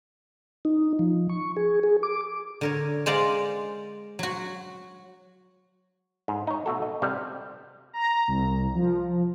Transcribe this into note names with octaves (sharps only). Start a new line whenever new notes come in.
D#4
F3
C#6
G#4
G#4
D6
D3 A#4 C#5
G#3 C5 D5 F5 F#5 A#5
F#3 F#4
G#2
D#4 C#5
B2 A3 F#4 A4
D#5
C3 G3 B4 G5
A#5
C2
F3